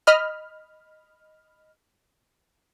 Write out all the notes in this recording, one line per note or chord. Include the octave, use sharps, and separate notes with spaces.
D#5 B5 F6